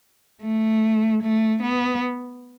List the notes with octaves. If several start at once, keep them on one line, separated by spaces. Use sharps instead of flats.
A3
A3
B3